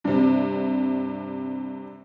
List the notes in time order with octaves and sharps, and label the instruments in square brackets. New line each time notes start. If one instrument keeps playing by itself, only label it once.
[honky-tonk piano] G2 C3